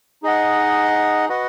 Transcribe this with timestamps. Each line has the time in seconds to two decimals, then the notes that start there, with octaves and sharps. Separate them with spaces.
0.23 D#4 G#4 D#5 F#5
1.29 F#4 B4 D#5 F#5